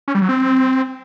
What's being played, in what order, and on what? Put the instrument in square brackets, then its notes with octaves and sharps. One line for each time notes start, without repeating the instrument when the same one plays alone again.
[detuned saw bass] C#4
G3
F#3
C4